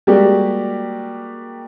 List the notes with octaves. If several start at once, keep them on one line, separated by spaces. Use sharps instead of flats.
G3 G#3 A#3 F#4 G4